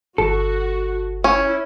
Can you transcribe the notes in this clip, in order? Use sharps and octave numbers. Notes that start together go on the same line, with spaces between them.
G1 F#4 A4
C#4 E4